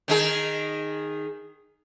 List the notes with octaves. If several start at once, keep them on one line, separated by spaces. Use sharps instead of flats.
D#3 D#4 G#4